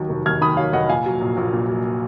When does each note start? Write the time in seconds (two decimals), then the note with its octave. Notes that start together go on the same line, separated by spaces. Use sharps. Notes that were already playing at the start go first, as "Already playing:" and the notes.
Already playing: D#2 D#3 F#3
0.09 F1
0.26 D#2 F6 G#6
0.41 D#3 B5 D#6
0.57 F#3 C#5 F5
0.73 F1 D#5 F#5
0.89 A#2 F5 G#5
1.06 F#3
1.21 A#1
1.37 A#1
1.53 A#2
1.69 F#3